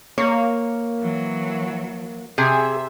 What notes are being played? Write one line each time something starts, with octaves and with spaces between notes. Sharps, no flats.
A#3 C#5
E3 F#3
C3 G#4 E5